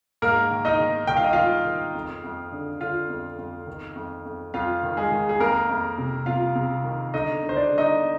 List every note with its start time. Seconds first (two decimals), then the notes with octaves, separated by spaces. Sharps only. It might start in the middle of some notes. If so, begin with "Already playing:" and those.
0.22 G#2 A#3 A#4
0.51 D#3
0.65 D#4 D#5
0.80 D#3
1.07 D#3 G5
1.17 F5
1.24 D#5
1.33 D#3 F4 F5
1.65 D#3
1.94 F2
2.24 F2
2.52 D3
2.81 D3 F4 F5
3.10 F2
3.38 F2
3.67 D#3
3.96 F2
4.25 F2
4.54 F2 F4 F5
4.83 D#3
4.97 G#3 G#4
5.11 D#3
5.29 G#4
5.40 F2 A#3 A#4
5.69 F2
5.98 C3
6.26 C3 F4 F5
6.55 C3
6.84 D#3
7.14 D3 D#4 D#5
7.43 D3
7.49 C5
7.56 D4 D5
7.71 D3
7.78 D#4 D#5